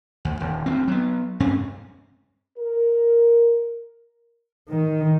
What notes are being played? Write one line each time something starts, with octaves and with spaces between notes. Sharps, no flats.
D2
D#1
D2 A3 C4
F#3 B3
G2 C4 C#4
A#4
D#3